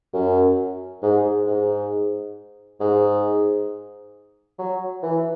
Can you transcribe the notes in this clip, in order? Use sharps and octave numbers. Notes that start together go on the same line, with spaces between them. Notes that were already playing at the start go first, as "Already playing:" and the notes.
F#2
G#2
G#2
G#2
F#3
E3